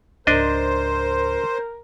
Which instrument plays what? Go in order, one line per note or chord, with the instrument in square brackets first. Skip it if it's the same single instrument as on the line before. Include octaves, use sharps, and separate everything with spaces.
[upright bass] C#2 G#2 [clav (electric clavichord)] D4 D#5 [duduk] A#4 [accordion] C5